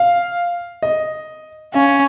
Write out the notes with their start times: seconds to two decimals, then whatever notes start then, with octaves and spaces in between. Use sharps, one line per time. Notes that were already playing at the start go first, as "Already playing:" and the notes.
Already playing: F5
0.82 D#5
1.74 C#4 F5